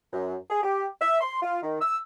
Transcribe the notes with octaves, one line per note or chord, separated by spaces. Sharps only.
F#2
G#4
G4
E5
C6
F4
D#3
E6